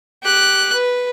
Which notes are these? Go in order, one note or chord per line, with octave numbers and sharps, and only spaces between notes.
G4 F#6
B4